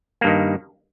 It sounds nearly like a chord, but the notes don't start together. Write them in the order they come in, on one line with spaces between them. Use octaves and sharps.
A#3 G2 D#3